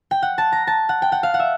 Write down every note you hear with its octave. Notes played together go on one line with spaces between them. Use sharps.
G5
F#5
A5
A#5
A5
F#5
G5
F#5
F5
F#5
E5